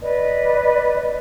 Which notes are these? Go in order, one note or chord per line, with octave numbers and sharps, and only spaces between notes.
B4 D5 D#5